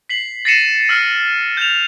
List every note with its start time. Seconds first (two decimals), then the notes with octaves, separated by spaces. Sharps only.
0.09 B6 C7 F#7
0.45 A6 A#6 C7 C#7 D#7 E7
0.89 E6 F6 C7 D#7
1.57 G6 E7 F7